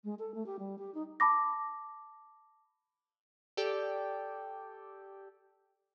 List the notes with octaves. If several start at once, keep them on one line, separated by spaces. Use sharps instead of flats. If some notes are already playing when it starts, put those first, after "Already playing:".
G#3
A4
A3
G4
G3
G4
D#4
A5 B5 D6 A#6
G4 A4 D5 G5